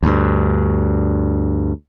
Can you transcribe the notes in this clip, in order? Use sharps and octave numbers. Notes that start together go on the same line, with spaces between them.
D2 G2